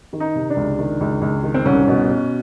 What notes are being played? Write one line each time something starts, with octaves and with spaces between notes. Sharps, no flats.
D#3
D#4
C3
D4
C#2
D#3
C#2
C#2
D#3
C4
C2 C#4
B2
B2